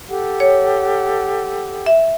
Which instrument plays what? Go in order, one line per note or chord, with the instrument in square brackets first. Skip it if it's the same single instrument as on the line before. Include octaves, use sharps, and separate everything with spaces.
[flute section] G4 A4 F#5
[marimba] C#5
E5